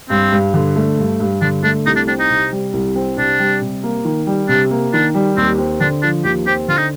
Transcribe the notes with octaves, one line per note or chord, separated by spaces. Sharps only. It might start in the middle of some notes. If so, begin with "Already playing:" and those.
G2 C4
G2
D3
A3
G2
G2
D3 D4
A3 D4
C2 D#4
D4
C4 D4
D#4
C3
G3
C2
C4
C3 D4
G3
C3
A#3
D#3
G3
C3 D4
A#3
D#3 D4
G3
D#2 C4
C4
D3 D4
F3 D4
D#2 G4
C4 G4
D3 F4
D#4